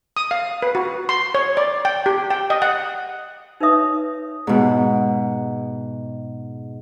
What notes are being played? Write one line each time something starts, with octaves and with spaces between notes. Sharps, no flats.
D#6
F5
B4
F#4
C6
C#5
D5
G5
G4
G5
D#5
F#5
D#4 A#4 B4 C#5 E5 D#6
G#2 B2